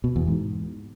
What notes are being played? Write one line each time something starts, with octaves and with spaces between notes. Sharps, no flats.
B2
E2
G#2